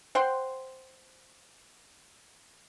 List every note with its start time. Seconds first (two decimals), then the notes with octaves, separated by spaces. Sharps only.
0.15 C5 F#5 G5 C6